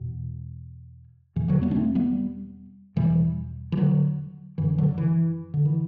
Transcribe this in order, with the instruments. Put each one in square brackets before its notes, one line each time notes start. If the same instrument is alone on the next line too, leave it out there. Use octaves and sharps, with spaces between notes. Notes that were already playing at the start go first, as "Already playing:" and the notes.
Already playing: [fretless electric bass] E2 B2
E2 B2 E3
D3 F#3
G3 B3
D4
A3 C4
G3 B3
E2 B2 E3 G3
E3
D3 F#3
F#2 D3 E3
D3 F#3
E3
D3
E3